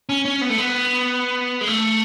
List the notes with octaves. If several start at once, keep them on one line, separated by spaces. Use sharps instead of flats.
C#4
C#4
B3
A3
B3
G#3
A3